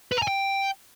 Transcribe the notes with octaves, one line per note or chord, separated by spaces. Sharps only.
B4
A#5
G#5
G5